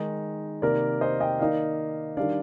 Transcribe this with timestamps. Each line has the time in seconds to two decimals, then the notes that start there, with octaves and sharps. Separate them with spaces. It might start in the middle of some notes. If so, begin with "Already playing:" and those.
Already playing: D#3 G#3 D#4
0.62 C3 D#3 A#3 A#4 D5
1.01 C5 D#5
1.20 D#5 G5
1.39 D#3 A#3 D#4 D5 F5
2.17 D#3 G3 D4 D5 F5